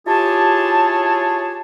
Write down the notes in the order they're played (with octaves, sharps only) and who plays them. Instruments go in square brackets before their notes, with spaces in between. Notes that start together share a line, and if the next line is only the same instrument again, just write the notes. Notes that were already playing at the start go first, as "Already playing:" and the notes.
[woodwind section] E4 F4 G4 G#4 C#5 A5